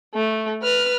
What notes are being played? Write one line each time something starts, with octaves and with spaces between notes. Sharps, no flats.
A3
B4 F6